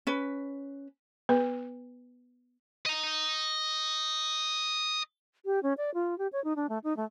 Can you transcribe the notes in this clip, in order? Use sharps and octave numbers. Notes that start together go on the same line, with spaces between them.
C#4 B4
B3 B4
D#5 A#5
G4
C#4
D5
F4
G4
C#5
D#4
D4
A3
D#4
A3